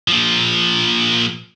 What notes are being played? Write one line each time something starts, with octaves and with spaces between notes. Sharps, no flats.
A#2 F3